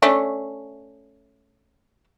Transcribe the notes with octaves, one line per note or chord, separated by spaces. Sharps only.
A3 C#4 D4